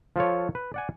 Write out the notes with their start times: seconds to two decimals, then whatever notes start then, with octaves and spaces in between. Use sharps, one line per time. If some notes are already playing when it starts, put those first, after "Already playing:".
0.16 F3 F4 A4 C#5
0.55 B4
0.74 D5 F#5 G#5